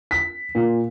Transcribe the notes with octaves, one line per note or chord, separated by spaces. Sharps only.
B6
A#2